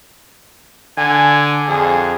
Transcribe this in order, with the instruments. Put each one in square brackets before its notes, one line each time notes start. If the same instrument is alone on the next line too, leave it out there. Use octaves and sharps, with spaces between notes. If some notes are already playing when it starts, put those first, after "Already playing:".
[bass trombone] D3 [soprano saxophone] G#5
[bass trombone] F2 [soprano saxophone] G#4